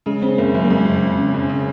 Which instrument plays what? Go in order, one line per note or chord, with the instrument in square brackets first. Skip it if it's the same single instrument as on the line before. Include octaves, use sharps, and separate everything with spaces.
[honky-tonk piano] C#3 [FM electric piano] G#3
[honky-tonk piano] C#3 [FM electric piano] C4
[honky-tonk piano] F#1 [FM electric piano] A#3
[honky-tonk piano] F#1 [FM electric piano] F#3
[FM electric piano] A#3
[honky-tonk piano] F2 [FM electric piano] G#3
[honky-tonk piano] F#1
C#3
C#3
F#1
C#3